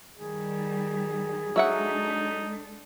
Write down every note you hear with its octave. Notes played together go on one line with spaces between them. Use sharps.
D#3 G3 G#4
F#3 G#3 D4 D#4 A4 E5 F#5